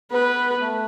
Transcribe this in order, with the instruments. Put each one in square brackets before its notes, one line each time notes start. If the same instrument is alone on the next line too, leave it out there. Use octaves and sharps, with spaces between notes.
[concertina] B3 [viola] B4
[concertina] A3